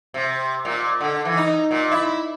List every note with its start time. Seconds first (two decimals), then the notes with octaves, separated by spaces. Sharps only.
0.14 C3
0.65 A#2
1.00 D3
1.25 E3
1.37 D#4
1.71 A#2
1.91 E4